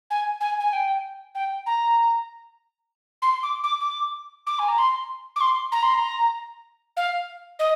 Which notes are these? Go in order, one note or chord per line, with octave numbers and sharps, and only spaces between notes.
G#5
G#5
G#5
G5
G5
A#5
C6
D6
D6
D6
D6
G#5
A#5
C6
D6
C6
A#5
C6
A#5
F5
D#5